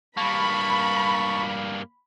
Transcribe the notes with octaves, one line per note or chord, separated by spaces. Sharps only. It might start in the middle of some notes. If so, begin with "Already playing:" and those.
G2 A#3 A5 B5 C#6